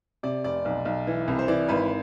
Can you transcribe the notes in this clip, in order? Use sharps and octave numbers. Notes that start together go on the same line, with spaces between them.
C3 D5
F1 D5
B1
B1
E3
C2
C5
E3 D5
G#1 B4